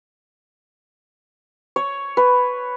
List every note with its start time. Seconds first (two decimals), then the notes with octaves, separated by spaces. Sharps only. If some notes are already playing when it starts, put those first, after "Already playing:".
1.76 C#5
2.17 B4